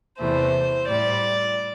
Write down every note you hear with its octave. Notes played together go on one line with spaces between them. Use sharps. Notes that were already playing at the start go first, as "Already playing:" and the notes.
E2 C3 E3 A3 C5
A2 G3 D5